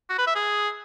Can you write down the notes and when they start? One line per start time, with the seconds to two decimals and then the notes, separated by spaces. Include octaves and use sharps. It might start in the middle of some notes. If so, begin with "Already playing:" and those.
0.10 F#4
0.18 B4
0.27 E5
0.35 G#4